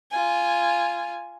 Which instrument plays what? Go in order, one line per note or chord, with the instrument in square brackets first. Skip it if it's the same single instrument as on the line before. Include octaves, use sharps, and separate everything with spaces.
[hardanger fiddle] F4 G#5